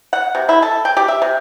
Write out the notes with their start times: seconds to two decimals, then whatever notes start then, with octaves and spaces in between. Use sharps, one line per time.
0.13 F#5
0.35 C3
0.49 E4
0.62 A4
0.85 G5
0.97 G4
1.08 E5
1.22 C3